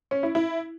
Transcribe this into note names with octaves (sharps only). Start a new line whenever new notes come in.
C#4
E4
E4